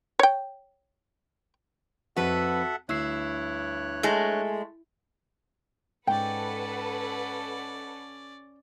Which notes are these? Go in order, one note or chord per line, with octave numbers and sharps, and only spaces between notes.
C#5 G5
F2 F#4 A4 B4 E5 F#5
D2 G2 E4 C#5 E6 F#6 C7
G#3 A3 A#6
G#2 C#4 A4 B4 D5 F#5 G5